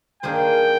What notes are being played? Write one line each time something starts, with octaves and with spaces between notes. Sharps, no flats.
D#3 A#3 D4 G#4 C5 G5